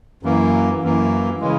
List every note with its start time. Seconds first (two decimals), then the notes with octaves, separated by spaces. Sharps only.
0.23 F#2 E3 A#3
0.82 F#2 E3 A#3
1.40 C#3 E3 G#3